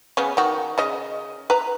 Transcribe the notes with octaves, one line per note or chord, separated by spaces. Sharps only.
C#3 B3 C#4
D#3 F#4
C#3 D#5
B4 A#5